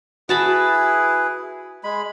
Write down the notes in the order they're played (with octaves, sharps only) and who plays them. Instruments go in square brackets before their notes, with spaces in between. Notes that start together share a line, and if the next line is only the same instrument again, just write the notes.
[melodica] E4 G#4 B4 [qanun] F#4 A5 B5
[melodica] G#3 B5